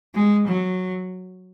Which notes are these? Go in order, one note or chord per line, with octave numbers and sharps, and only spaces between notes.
G#3
F#3